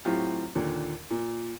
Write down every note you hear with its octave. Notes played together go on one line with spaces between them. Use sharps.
A2 F#3 C4 F4 G4
D#2 A#2 D3
A#2